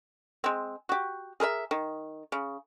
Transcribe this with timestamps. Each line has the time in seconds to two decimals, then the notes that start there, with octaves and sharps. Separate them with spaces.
0.44 G#3 C4
0.89 F#4 G4
1.40 G#4 A#4 B4 E5
1.71 D#3
2.32 C#3